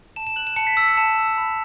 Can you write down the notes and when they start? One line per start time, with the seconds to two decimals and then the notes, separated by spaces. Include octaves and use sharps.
0.16 A5 E7
0.27 E7
0.36 F#6 F#7
0.47 E7
0.56 A5 C#7
0.67 B6
0.77 E6 B6
0.88 C#7
0.97 A5 E7
1.18 E6
1.38 B5